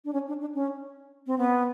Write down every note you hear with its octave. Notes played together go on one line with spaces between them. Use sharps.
D4
C#4
D4
D4
C#4
C4
B3